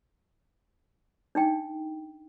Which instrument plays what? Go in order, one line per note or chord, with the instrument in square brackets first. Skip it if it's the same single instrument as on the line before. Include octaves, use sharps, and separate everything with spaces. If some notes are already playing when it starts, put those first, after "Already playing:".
[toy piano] D4 D#4 G5